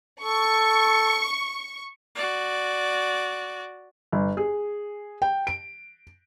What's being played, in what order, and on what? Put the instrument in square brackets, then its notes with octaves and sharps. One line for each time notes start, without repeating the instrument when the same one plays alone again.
[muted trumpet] A4 [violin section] C#6
[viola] F#4 D5
[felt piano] G1
G#4
G5
D7